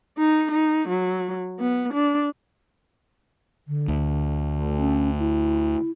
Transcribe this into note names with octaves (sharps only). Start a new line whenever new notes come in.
D#4
D#4
F#3
B3
D4
D3
D2
C#4
E4